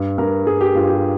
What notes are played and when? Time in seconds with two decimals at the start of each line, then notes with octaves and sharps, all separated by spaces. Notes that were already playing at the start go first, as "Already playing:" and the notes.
Already playing: G2
0.18 G2 A#4
0.46 G2 G#4
0.61 G4
0.75 G2 F4
0.89 G4